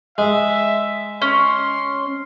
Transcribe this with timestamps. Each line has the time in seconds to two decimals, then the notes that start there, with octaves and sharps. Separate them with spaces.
0.18 G#3 E5
1.22 C#4 C6